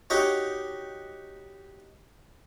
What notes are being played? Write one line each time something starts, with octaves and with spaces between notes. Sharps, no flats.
D#4 F#4 G4 C#5